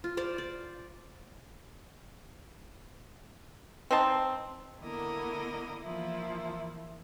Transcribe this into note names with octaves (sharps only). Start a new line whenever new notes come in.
F4
C5 D5 F5
D5
C4 D#4 C5 A5
D3 A#3 B3 E4 A#4 D#5
E3 F3 A#3 E4